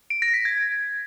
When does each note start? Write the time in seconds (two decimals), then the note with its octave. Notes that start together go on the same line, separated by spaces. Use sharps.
0.10 D7
0.22 A#6
0.34 B6
0.45 G#6